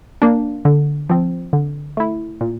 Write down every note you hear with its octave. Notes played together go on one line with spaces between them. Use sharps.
A#3 D4
D3
F3 C4
D3
A3 E4
A#2